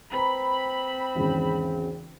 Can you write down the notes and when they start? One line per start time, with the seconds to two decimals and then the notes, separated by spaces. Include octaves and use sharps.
0.13 C4 B4 A#5 B5
1.15 G#1 E2 C#3